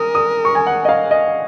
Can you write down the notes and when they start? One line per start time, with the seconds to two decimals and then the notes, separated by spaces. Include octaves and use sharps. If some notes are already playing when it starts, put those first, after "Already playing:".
Already playing: A#4 D#6
0.15 D#6
0.45 C#6
0.55 G#5
0.67 F#5
0.85 D#5
0.89 F5
1.11 D#5